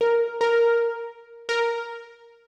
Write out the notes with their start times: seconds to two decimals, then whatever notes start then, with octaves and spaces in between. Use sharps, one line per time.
0.01 A#4
0.41 A#4
1.49 A#4